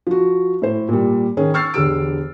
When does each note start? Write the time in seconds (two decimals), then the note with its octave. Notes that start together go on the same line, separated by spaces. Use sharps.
0.07 F3 F#4
0.62 A2 C5
0.89 A#2 G3
1.37 D#3 C#4 G#4
1.54 C#6 E6 F6 A6 C7
1.74 E1 D3 G4 E6 D7